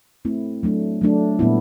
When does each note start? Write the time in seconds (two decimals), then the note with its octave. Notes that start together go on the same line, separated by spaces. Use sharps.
0.25 A3 C4 E4
0.63 F#3 A3 D4
1.01 F#3 A3 D4
1.39 A#2 G3 B3 E4